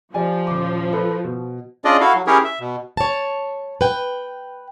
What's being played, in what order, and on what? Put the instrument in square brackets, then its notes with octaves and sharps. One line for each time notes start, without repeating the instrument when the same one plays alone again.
[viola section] F3 [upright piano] G4 D5 G#5
[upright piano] D#1 D6
A4 B4
B2
[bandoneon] C#4 D4 F4 G#4 D5 D#5
E4 F#4 A4 F5
F#3
C#4 E4 G4 G#4 A#4 C#5
E5
B2
[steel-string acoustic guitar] C#5 A5
B4 G5